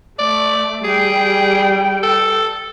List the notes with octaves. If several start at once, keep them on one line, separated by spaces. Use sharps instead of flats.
A3 D5
G3 G#4 G5
A4